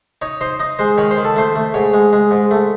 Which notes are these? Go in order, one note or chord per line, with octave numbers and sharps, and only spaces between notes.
D#4 C#5
D#4 C5
D#4 D#5
G#3 C5
D#3 C#5
C5
D#3
A4
A3 C5
A3
G#2 C#5
G#3
G#3
G#2
A3